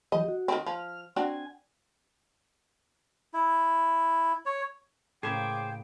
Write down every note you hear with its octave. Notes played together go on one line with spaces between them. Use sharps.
E3 F#3 G4 D#5
F#4
D#3 C4
F3 F6
C4 D4 F#4 G#5
E4
C#5
A2 C#3 A#3 G#4 C5 G5 G#5 D6